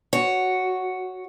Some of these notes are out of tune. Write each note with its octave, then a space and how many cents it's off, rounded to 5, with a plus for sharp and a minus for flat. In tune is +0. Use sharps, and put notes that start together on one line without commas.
F#4 +0 C#5 +0